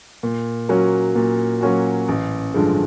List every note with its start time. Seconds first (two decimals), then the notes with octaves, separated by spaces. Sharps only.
0.23 A#2
0.69 F#3 A#3 C#4 F#4
1.15 A#2
1.61 F#3 A#3 C#4 F#4
2.08 A1
2.54 G2 D3 F3 G#3